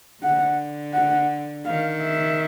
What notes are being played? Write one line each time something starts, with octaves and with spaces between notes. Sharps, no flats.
D3 F#5
F#5
D#3 F5
E5